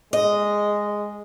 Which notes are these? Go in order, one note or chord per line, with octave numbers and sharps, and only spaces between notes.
G#3 D#5